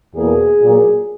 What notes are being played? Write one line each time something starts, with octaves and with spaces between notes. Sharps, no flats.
E2 B2 A#3 G#4
A#2 F#3 A#3